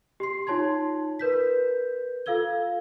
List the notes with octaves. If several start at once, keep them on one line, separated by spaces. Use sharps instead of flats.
G4 C6 C7
D#4 F4 C#5 A5 C6 G#6
A#4 B4 G6 B6
F4 A4 F5 E6 G#6 G7